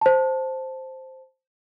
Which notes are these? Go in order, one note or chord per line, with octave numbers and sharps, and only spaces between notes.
C5 A5